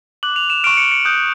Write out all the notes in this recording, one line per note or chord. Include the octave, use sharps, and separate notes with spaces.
D6 F#6 F#7
F7
E7
C#6 F6 D7
C#7
C#7
D#6 F#6 G6